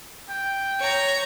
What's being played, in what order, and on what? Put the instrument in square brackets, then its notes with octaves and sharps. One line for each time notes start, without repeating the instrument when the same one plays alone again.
[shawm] G5
[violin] C#5 A#5